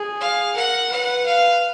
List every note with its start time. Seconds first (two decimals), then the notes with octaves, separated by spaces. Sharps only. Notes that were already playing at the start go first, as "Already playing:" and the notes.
Already playing: G#4
0.21 F5
0.56 A#4 F#5
0.90 B4 F#5
1.26 F5